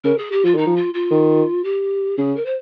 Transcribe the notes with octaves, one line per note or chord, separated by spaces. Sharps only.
C#3 A#4
G#4
G4
F3 F4
D#3 D#4
F3
F4
F4
D#3
G4
C#3 G#4
A#4
C5